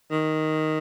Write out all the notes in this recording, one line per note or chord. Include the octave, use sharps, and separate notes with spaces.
D#3